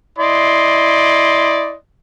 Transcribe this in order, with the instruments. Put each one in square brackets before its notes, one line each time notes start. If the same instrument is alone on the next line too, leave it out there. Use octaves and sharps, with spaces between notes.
[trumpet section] E4 D5 D#5 C6